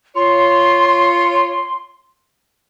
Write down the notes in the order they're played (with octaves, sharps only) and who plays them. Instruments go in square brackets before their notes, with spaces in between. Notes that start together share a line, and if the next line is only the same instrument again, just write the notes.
[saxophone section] F4 C#5 [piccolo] C6